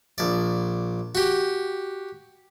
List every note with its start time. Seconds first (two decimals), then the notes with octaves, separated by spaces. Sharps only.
0.18 A#1 D5
1.15 F#4 G4